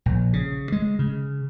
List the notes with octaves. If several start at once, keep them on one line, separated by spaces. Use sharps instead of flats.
A#1
C#3
G#3
C#3